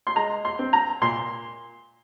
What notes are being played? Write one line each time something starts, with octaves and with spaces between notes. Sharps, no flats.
C6
G#3 A#5
C6
C4
A#5
A#2 C6